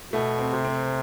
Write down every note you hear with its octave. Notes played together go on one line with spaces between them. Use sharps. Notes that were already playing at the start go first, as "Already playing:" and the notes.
B2 A3
C4
C3
C4